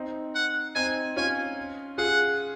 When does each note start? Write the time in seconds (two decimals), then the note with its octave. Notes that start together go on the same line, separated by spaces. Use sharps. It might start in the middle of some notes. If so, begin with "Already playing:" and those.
Already playing: C4 D#4
0.35 F#5
0.75 C4 D#4 G#5
1.16 C#4 F4 G#5
1.98 F4 G#4 F#5